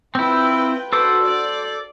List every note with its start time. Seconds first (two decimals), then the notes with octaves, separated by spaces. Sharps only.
0.15 C4 E4 F4 B4 G5
0.93 D4 F#4 A4 B4 C5 D6
1.25 D5